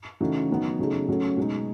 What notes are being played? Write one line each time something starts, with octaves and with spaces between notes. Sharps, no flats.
C#3 E3 A3 D#4 F#4
D#3 F#3 B3 D#4
C#3 F#3 A3 D#4 G#4
C#3 F#3 A3 C#4 F#4
B2 G#3 D#4